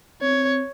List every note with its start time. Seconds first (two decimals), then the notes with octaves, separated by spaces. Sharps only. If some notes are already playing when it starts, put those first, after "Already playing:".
0.22 C4 C#5